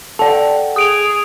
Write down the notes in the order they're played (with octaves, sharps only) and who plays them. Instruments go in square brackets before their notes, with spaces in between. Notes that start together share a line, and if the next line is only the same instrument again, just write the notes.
[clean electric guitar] A4 F#5 G5 [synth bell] D5 A5
[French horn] G#4 [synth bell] D#6 D7 F7